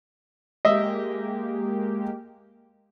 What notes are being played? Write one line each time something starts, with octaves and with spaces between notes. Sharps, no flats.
G#3 A#3 G4 D#5 E5